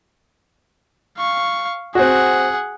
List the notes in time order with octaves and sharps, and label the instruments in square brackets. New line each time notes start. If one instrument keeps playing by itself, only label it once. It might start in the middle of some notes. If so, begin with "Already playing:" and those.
[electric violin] F5 C#6
[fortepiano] C4 F#4 [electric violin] G#4 F#5